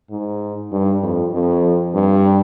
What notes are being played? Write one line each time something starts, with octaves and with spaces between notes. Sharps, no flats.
G#2
G2
F2
F2
G2